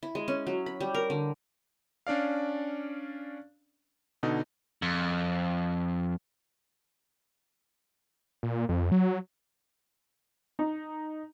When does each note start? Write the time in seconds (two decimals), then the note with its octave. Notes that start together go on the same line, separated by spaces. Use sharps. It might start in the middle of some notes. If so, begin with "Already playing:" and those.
0.03 E4
0.15 G#3
0.28 C#4
0.47 F#3
0.66 B5
0.81 G3
0.94 A#4
1.10 D3
2.07 C#4 D4 D5 F5
4.23 B2 D3 D#4
4.82 F2
8.43 A#2
8.69 F2
8.92 F#3
10.59 D#4